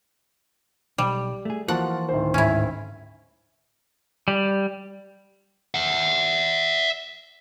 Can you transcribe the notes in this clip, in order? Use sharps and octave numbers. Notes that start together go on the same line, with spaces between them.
B1 G3
A3 G#4
E3 F3 A#3 F#4 F#5 A5
D1 D#3 C5
G#2 C#4 E4
G3
E5 F#5